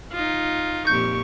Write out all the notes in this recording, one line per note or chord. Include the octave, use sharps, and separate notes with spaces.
D#4 F4
F2 A#2 G4 C#6 G6